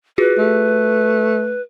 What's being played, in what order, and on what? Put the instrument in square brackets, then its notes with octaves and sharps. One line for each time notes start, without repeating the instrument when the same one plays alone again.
[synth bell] F4 F#4 G#4 [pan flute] B4
[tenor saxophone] A3